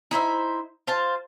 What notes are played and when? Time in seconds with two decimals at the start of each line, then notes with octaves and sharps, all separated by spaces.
0.11 D#4 E4 C5 E5
0.87 F4 C5 A5